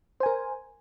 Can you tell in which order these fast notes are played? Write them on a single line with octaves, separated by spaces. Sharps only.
C5 G#5 A#4